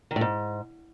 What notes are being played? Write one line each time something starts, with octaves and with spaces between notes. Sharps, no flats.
D#3
A2
G#2